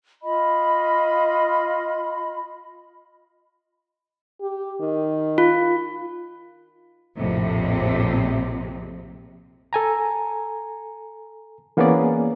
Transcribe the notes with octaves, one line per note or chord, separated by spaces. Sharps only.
F4 D#5 B5
G4
D#3
F4
A#1 F2 A2 C3
A4 G#5 A#5
E3 A#3 B3 C#4 G#4 D5